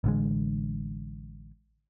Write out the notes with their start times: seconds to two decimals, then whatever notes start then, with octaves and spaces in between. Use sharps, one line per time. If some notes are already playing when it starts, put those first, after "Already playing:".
0.04 A1 D3 G#3